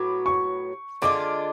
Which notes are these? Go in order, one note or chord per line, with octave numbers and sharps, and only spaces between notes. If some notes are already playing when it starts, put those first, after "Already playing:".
Already playing: A2 F#3 B3 F#4 D6
C#6
D3 G#3 D4 F4 D6